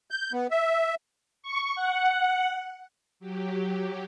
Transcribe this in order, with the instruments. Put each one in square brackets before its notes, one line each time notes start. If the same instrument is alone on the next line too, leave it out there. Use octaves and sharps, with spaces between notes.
[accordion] G6
B3
E5
[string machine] C#6
F#5
F#3 G4